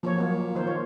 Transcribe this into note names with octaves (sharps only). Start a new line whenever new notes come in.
A#2 F3 C#5
F#3 A#3
D#3 A#3 C5
F4 C#5